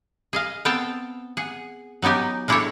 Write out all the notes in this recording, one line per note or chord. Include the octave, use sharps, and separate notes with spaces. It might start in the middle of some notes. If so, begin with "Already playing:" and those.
G#4 D#5 F5
B3 C4 F5 G5 A5
G#4 F#5
F#3 B3 D#4 G4 G#5
G#3 D4 E4 G4 A4 C#5